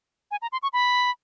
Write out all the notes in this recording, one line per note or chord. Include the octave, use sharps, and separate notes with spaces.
G#5
A#5
C6
C#6
B5